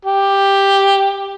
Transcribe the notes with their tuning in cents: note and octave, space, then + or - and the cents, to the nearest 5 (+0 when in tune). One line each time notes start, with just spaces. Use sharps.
G4 +5